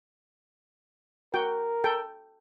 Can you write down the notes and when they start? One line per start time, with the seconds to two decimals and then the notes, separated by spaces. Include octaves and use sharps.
1.34 F#4 A#4 G5
1.84 A4 G5